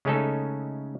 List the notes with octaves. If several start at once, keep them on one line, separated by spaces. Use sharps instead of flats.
C#3 G#3 A3 C#4 D#4 A4